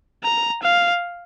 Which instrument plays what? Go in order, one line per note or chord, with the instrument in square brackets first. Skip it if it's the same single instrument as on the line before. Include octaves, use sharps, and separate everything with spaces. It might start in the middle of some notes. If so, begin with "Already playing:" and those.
[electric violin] A#5
F5